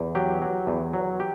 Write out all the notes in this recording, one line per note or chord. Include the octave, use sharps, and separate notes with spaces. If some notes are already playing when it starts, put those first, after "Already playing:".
Already playing: E2
F#3 G4
F#3
E2
F#3
G4